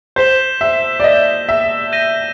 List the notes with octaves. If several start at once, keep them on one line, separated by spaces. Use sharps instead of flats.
C5 G6 B6 E7 G7
E5
D5
D#5 G6 B6 E7 G7
E5
G6 A#6 D#7 G7